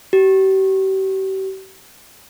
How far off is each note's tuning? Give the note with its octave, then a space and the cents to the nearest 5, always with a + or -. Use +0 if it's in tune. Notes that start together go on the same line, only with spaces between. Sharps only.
G4 -40